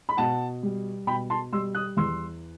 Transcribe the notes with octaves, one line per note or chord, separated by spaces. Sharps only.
B5
B2 F#5 A5
G3
B2 G5 B5
A5 C6
G3 C6 E6
D#6 F#6
E2 C6 E6